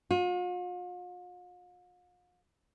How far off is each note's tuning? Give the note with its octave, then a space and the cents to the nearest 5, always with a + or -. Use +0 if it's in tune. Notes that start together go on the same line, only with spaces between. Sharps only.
F4 +45